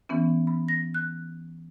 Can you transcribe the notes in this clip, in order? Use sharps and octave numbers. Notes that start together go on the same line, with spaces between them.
E3 B3 C#4
B5
A#6
F#6